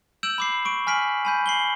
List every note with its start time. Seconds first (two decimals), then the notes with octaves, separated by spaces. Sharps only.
0.23 E6 G6 D7 E7 F#7
0.38 B5 D6 C7
0.65 C#6 D7
0.87 G#5 F6 B6 D7 F#7
1.25 G#5 B5 G6
1.46 C7 F#7 G7